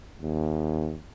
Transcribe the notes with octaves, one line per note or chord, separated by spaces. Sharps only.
D#2